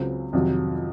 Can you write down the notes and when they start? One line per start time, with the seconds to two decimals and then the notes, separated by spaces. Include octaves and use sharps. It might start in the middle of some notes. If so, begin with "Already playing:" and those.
Already playing: C#2 C#3 F#3 C4
0.33 F2 C3 D#3 F#3